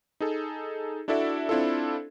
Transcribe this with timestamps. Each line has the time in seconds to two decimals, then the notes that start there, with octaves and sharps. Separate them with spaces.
0.20 D#4 G#4 A4
1.08 D4 E4 F#4 A4 D5 E5
1.49 C4 D4 E4 F4 A4